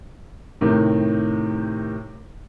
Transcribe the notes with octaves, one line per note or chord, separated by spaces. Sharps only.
A2 C3 D#3